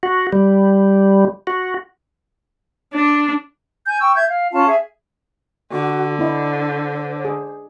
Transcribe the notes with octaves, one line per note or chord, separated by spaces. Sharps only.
F#4
G3
F#4
D4
G#5 G6
G5 C#6 E6
E5 G6 G#6
F5
C#4 F4 F5 A5
G#4 E5
D3 F#4
B3 E4 C5 D#5
G#4